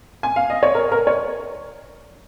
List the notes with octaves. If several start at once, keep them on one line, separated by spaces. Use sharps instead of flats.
G#5
F5
D#5
C#5
A#4
A#4
C#5